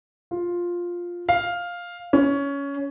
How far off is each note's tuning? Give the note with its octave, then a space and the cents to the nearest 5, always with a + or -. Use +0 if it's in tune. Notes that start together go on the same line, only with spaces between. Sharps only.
F4 +5
F5 +5
C#4 +15